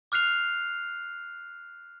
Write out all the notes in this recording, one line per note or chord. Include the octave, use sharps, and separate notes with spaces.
D6 F6 F#6 C7 F7